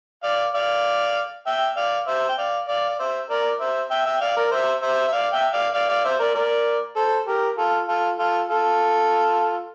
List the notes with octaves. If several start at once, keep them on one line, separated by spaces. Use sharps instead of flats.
D5 F5
D5 F5
E5 G5
D5 F5
C5 E5
G5
D5 F5
D5 F5
D5
C5 E5
A#4 D5
C5 E5
E5 G5
E5 G5
D5 F5
A#4 D5
C5 E5
C5 E5
E5
D5 F5
E5 G5
D5 F5
D5 F5
D5 F5
C5 E5
A#4 D5
A#4 D5
A4 C5
G4 A#4
F4 A4
F4 A4
F4 A4
F4 A4